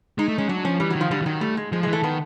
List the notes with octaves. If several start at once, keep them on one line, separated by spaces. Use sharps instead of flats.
G#3 D#4
A3
G#3 C#4
F#3 D4
F3 C#4
E3 G3
F#3
D#3
F3
D3 G3
E3
D#3 F#3
G3 A3
G#3
F3 G#3
E3 G#3
A3
D#3 B3